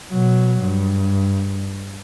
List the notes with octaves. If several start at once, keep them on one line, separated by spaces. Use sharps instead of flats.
B2 F#3
G2